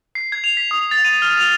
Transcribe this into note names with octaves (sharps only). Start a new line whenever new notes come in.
C7
G#6
F7
B6
D#6
A6
D#7
F6
F7